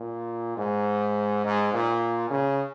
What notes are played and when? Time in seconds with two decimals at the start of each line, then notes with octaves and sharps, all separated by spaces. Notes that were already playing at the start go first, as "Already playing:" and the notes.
Already playing: A#2
0.57 G#2
1.45 G#2
1.73 A#2
2.30 C#3